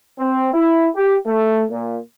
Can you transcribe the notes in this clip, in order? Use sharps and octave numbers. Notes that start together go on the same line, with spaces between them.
C4
E4
G4
A3
A#2